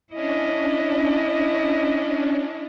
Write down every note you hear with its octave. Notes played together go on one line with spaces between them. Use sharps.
C#4 D4 E4 D#5